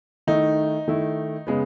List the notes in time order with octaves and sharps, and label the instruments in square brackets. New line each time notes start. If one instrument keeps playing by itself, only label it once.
[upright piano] D#3 A3 E4 [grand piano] D#4
[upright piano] D#3 A3 E4
C#3 G#3 B3